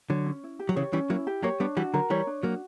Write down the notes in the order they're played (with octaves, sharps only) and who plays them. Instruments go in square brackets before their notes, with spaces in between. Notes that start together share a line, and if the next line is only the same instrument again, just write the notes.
[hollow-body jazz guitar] D3 F#3 [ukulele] C#5
[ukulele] C#4
E4
G4
[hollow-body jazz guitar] F#3
[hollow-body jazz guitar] C#3 E3 [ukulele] C#5
[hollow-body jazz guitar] E3 G3 [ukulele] C#4
[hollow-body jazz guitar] F#3 A#3 [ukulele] E4
[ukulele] G4
[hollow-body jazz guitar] F#3 A#3 [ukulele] C#5
[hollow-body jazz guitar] G3 B3 [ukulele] D4
[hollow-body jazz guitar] E3 G3 [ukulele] F#4
[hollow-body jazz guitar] D3 F#3 [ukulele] A#4
[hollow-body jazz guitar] E3 G3 [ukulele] C#5
[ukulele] D4
[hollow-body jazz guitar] F#3 A#3 [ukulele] F#4